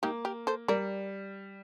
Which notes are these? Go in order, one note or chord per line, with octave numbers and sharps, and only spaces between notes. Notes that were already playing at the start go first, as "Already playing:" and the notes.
A#3 D#4 G4
G4 A#4
A4 C5
G3 A#4 D5